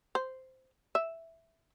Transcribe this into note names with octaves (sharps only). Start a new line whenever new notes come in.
C5
E5